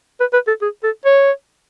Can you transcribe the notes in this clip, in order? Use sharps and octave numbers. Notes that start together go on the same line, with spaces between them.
B4
B4
A4
G#4
A4
C#5